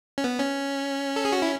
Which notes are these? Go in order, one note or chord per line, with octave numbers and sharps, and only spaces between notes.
C#4
B3
C#4
A4
G#4
F#4
E4